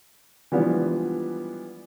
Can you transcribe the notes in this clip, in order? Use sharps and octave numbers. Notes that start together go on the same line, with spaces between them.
E3 F3 G3 G#3 B3 D4